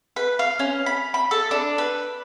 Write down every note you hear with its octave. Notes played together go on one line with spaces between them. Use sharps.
B4
F5
C#4
B5
B5
A4
D4
B4